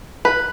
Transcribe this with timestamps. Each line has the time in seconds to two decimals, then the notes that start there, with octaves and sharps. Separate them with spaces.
0.25 B4